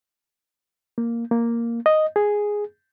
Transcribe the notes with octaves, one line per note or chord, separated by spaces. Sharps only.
A#3
A#3
D#5
G#4